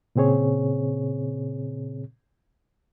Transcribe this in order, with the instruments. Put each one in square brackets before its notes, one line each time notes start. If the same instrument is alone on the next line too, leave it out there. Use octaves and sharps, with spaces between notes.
[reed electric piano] A#2 C#3 C4 G#4 C#5